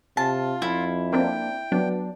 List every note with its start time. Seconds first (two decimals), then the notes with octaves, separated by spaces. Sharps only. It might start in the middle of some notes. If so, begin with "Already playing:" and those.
0.17 C3 F4 A5
0.62 F2 E4
1.13 A#3 C4 D4 G5
1.72 F#3 B3 D4